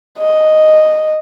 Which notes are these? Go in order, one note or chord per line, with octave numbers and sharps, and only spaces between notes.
D#5